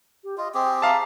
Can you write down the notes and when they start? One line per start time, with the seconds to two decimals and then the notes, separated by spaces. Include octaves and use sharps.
0.24 G4
0.38 F4 D#5
0.54 C4 G4 G#4 G5
0.82 E5 F5 A5 A#5